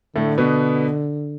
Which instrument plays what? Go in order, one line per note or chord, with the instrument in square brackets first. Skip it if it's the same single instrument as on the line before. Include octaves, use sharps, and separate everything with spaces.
[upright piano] A2 A3 [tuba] D3
[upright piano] B2 B3